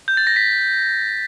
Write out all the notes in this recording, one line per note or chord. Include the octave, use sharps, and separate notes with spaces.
G6
A6
A#6
B6